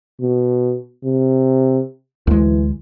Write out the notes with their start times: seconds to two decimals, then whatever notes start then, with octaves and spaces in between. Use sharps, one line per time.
0.21 B2
1.04 C3
2.27 D2 E3 G#3